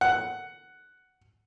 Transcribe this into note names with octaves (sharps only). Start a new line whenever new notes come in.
F#5